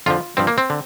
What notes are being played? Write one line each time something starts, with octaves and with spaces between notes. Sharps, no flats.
F2 D3 F3 F4
G2 F3 C4
A#3
C4
D3